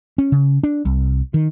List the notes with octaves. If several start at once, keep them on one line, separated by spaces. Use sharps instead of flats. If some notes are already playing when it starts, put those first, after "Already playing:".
C#4
C#3
D4
C2
D#3